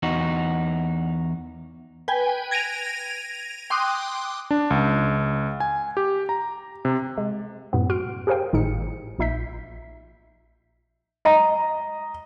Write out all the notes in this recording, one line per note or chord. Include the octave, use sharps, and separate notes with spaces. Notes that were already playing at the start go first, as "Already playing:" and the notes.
E2 D#4 F#4
B4 G5 G#5
G#6 A#6 D7 D#7 F7
G5 C6 D6 D#6 F#6
D4
C#2
G#5
G4
A#5
C3
G#3
F#2 A2 C3 B3
F#4 C6 F6 D7
G4 G#4 A#4 C5 F5 G5
G#1 A2 D#4 G#4 C#7
A#1 A#2 D#4 E5 G6 B6
D#5 A#5